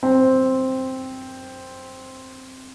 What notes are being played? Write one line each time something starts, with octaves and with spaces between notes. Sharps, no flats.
C4